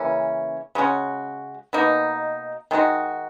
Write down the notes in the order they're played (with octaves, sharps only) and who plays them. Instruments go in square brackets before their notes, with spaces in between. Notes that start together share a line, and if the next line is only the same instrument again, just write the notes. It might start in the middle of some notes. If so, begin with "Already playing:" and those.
Already playing: [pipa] C#3 E3 A#3 C#4
C#3 G#3 C#4 F#4
B2 A#3 D#4
D#3 G#3 D#4 F#4